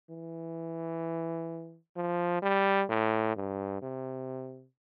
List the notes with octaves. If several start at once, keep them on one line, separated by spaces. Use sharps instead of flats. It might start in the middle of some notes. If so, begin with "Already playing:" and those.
E3
F3
G3
A2
G2
C3